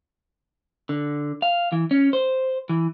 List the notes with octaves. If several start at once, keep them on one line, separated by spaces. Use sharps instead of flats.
D3
F5
E3
C#4
C5
E3